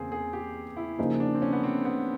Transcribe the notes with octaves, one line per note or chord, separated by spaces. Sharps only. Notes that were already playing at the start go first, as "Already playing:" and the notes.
Already playing: E2 C#3 E3 A#3 C4 G#4
G#4
G4
E4
C#3 F3 A#3 D#4 G#4
D4
C4
C#4
B3
C4
B3